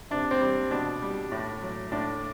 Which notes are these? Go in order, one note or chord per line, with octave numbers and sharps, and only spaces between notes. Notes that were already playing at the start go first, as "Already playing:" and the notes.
C3 D4
C4
G3
B2 D4
G3
A2
F#3
A2 D4